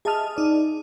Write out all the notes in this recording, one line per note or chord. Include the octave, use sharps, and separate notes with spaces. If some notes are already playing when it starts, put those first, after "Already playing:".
G#4 D#5 E5 A5 D#6 F6
D#4 D5